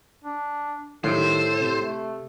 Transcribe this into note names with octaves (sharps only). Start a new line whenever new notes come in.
D4
A2 D#3 G3 A4 C5
C3
A3